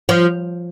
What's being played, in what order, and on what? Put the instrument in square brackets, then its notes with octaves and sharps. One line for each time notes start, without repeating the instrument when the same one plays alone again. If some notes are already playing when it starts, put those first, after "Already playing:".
[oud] F3